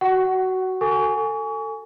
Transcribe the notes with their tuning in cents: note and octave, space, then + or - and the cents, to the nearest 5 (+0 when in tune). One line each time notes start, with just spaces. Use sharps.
F#4 +15 F#5 +25 C#6 +0
A4 +20 G#5 +0 C#6 +35